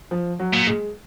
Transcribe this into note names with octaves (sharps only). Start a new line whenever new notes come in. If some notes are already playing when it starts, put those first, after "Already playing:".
F3
F#3
A#2
G#3